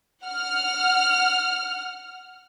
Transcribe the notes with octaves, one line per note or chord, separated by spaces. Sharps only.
F#5 F6